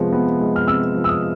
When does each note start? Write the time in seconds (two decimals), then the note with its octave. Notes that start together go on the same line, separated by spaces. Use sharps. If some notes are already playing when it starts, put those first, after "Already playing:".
Already playing: C3 F3 G#3 B3
0.13 B3
0.40 G#3
0.56 F6
0.68 C3 E6
0.95 F3
1.04 E6
1.09 D#6